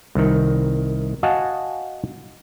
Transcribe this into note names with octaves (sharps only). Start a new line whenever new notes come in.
C2 D#3
F#4 D#5 F5 F#5 G#5 A5